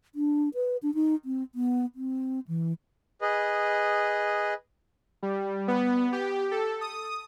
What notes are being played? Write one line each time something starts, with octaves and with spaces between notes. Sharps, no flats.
D4
B4
D4
D#4
C4
B3
C4
E3
G#4 B4 D#5
G3
B3
G4
A4
D#6